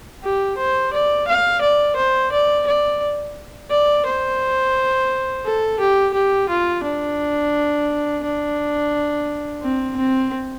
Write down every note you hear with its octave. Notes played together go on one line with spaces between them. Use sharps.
G4
C5
D5
F5
D5
C5
D5
D5
D5
C5
A4
G4
G4
F4
D4
D4
C4
C4